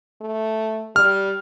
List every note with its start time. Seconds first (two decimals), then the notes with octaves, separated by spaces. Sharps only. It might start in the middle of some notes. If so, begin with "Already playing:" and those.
0.22 A3
0.96 G3 F6